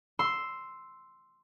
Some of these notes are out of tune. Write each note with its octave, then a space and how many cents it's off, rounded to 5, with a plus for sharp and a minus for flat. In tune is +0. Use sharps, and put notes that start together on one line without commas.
C6 +0 E6 +0